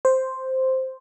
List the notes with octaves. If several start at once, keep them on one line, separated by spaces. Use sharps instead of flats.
C5